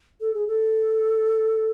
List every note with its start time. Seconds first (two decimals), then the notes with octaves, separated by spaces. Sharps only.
0.21 A4
0.34 G#4
0.48 A4